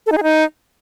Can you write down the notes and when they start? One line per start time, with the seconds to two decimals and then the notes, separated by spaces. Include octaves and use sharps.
0.06 A4
0.12 D#4
0.18 G#4
0.23 D#4